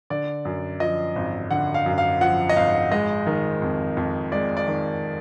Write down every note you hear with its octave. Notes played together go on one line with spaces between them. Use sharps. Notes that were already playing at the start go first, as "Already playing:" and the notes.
D3 D5
F#2
F3 D#5
G#1
D3 F#5
F5
F#2
F5
F3 F#5
D#5
G#1 F5
G#3 D#5
D#3
F2
F2
G#3 D5
D5
D#3